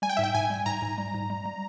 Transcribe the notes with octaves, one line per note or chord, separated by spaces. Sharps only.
G3 G#5
G5
G#2 E5
G5
G#2 G#5
G3
G#2 A#5
G#2
G3
G#2
G3
G3